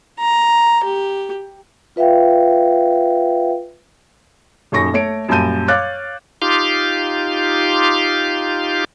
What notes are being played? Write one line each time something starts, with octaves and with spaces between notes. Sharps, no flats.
A#5
G4
F4 B4 E5 F5 G5
D#1 F#2 D#4 C#6 A#6
A3 C#5 D7
F#2 A#2 G3 A5 G6 D#7
C#5 F5 D6 F#6 A6
D#4 F4 G4 F5 C6 D6